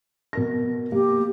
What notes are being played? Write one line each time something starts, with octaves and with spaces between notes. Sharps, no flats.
B2 A#4 A#6
A#3 G4